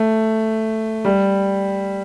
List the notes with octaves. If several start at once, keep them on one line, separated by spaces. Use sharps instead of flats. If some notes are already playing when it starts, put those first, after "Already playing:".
Already playing: A3
G3